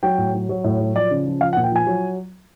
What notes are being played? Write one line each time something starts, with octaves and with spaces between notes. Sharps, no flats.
F#3 G5
A2
F#3
F#3
A2
F#3
F3 D5
C#3
F3
F3 F5
F#5
A#2
G5
F3 G#5
F#3